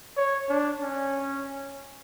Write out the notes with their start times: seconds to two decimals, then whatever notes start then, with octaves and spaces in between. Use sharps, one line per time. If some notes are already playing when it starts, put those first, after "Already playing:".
0.17 C#5
0.49 D4
0.82 C#4